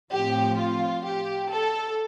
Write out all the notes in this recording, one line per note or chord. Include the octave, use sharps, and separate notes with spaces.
A2 F3 C4 G4
F4
G4
A4